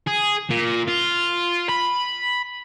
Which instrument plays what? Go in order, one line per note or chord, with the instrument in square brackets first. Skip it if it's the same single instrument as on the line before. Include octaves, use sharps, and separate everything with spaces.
[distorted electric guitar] G#4
A#2
F4
B5